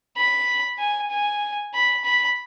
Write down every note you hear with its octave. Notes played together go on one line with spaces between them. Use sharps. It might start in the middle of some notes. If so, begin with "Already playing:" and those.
B5
G#5
G#5
B5
B5